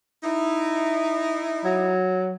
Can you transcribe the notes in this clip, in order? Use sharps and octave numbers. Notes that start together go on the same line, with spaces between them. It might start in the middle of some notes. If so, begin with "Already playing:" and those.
D#4 E4
F#3